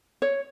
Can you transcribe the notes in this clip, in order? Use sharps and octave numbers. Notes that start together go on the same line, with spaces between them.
C#5